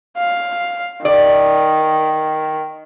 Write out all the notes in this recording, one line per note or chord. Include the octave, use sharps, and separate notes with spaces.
F5
D#3 D5